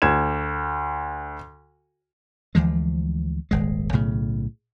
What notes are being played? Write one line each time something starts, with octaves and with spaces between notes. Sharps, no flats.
D2 G#6 E7
D2 E3 F3 G#3
D#1 G#1 G#3
B1 A2 C#3